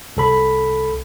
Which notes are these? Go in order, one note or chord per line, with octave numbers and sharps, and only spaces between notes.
C2 A4 B5